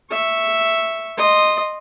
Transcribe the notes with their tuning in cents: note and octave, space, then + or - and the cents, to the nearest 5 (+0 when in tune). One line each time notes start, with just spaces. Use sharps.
E5 +0 C#6 -5
D#5 -10 C6 +0